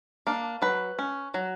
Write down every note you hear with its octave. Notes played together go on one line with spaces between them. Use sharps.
A#3 D4
F#3 B4
C#4
F#3